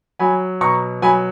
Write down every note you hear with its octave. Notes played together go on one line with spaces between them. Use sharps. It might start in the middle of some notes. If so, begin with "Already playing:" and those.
F#3 G#5 B5
B2 A#5 C#6
F#3 G#5 B5